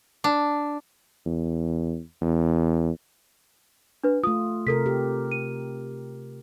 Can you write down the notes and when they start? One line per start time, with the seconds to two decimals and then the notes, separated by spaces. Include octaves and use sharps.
0.24 D4
1.26 E2
2.22 E2
4.04 D4 B4
4.24 A3 F4 D#6
4.67 C3 A4 A#4 B6
4.86 G4
5.32 D#7